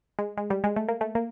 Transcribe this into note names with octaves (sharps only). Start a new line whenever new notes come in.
G#3
G#3
G3
G#3
A3
A#3
A3
A#3